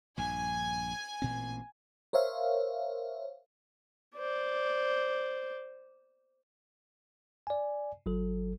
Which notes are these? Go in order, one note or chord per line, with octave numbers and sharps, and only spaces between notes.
A#1 G2 G#5
A1 A#2 C4
A#4 C5 C#5 E5 F5
C5 D5
D5 G#5
G1 F#3 A4